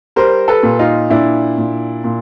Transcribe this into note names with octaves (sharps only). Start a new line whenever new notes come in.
G3 A#4 C5
A4 B4
A#2
D#4 F4
A#2 D4 E4
A#2
A#2